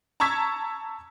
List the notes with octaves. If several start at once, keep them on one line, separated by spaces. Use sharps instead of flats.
A5 A#5 C#6 E6 G#6 B6